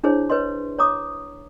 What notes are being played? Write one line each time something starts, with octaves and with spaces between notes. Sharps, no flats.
D4 E4 G#4 C5 C#5
B4 C#5 D#5 C6
C#5 A#5 D6 D#6